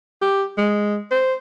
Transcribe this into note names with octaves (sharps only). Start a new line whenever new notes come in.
G4
G#3
C5